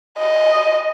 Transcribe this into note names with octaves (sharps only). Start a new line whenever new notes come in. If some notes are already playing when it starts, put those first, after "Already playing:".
D#5